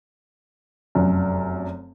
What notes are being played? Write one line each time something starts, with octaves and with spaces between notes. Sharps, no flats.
F1 F#2